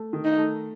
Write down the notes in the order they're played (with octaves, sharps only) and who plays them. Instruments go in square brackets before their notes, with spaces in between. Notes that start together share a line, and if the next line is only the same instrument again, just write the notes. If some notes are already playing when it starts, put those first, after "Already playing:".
Already playing: [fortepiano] A3
D#3
[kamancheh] D#4
[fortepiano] A3